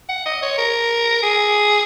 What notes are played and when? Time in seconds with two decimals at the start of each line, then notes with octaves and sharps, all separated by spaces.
0.09 F#5
0.26 D#5
0.42 C#5
0.58 A#4
1.23 G#4